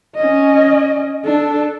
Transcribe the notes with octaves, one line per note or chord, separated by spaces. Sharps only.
C#4 D#5
D4 A4